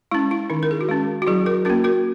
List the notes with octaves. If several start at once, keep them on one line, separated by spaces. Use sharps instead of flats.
G#3 C#4 E4
E4
D#3 D#4
A#4
G#4
F#4
G#3 C#4 E4
F#4
F#3 E4 G#4
F#4 A#4
A#3 C#4 F#4 A#4
F#4 A#4